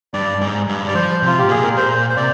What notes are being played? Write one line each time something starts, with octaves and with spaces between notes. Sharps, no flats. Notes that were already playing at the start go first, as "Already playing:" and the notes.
G2 D5
G#2
G2
G3 D5
F3 C5
C3 F4
G#2 G4
A#2 G#4
A#4
A#2 C5
C5
C3 D5